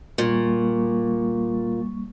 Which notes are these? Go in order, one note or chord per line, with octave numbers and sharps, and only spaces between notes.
A#2 G3 A#3 C#6